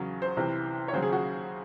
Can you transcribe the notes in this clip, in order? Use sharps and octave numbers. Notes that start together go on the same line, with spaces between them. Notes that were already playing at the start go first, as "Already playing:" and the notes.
Already playing: E2 C#3 F#3
C5
C2 C3 E3
C#5
D#2 C#3 F#3 C5
G#4
F#4